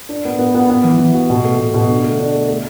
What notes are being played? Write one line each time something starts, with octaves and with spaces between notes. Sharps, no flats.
D4
B3
B3
B3
B3
E3
E3
F#4
B2
A3
B2
B2
D3
A3
D4
A3
A3